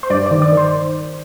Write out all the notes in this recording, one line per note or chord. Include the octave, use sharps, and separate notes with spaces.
C5
G2 D5
D#3 D5
D5
D#3
C5